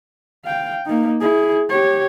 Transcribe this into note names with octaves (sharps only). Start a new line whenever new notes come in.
F5 G5
A#3 D#4
E4 G#4
G4 C#5